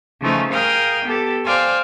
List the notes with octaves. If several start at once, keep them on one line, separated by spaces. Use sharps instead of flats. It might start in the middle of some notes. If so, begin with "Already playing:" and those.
C#3 E3 F3 A3 D#4
G#4 A#4 F5 G5 D#6 F6
B3 G4 A4
C5 D5 F5 G5 G#5